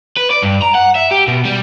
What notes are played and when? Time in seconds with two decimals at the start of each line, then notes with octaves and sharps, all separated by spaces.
0.17 B4
0.31 D5
0.43 G2
0.62 A#5
0.75 F#5
0.96 E5
1.11 G4
1.28 B2
1.45 G3